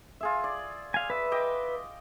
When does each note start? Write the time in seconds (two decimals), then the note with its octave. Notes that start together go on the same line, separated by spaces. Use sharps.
0.21 F4 G#4 E5
0.44 D5
0.94 F5 G#5
1.10 B4 E5
1.32 D#5 G5 D6